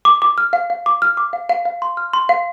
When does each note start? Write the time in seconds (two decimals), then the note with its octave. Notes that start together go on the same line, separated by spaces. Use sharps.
0.05 D6
0.22 D6
0.38 F6
0.53 F5
0.70 F5
0.86 D6
1.02 F6
1.17 D6
1.33 F5
1.49 F5
1.65 F5
1.82 C6
1.97 F6
2.13 C6
2.29 F5